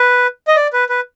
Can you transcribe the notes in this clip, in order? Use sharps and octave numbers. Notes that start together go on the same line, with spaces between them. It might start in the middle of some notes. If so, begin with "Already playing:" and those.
Already playing: B4
D#5
D5
B4
B4